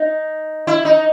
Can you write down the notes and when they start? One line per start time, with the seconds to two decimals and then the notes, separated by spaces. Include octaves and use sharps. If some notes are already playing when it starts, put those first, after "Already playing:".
Already playing: D#4
0.67 E4
0.85 D#4